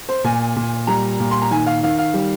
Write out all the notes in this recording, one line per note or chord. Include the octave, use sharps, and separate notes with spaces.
C5
A#2 G#5
A#2
G3 A#5
A#2
C6
A#5
D#3 G#5
F5
D#3 F5
F5
G3